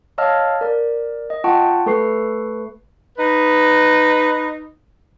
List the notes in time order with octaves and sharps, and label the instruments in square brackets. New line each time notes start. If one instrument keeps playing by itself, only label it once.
[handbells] C#5 D#5 F5 A5 E6 F6
A#4 D5
D#5
F4 F#5 G5 A5 C#6
A3 A4 B4 C#6 C7
[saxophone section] D#4 B4